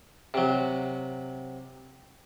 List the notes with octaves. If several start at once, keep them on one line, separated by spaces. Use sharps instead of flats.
C3 F#3